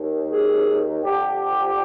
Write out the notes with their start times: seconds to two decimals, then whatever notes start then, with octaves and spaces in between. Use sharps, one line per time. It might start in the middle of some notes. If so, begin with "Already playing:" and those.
Already playing: D#2 D#3
0.31 G#4
1.03 F2 D3 F3 G4